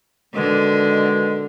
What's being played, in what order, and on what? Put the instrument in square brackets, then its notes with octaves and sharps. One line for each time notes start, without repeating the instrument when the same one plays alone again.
[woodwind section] B2 D#3 G#3 [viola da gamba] D3